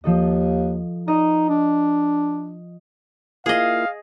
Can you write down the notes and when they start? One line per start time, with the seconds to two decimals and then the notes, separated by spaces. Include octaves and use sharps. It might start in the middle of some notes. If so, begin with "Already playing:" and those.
0.04 D#2 F3 A4 D#5
1.08 D#4 D#5
1.49 D4
3.46 A#3 E4 F4 G#4 D#5 F5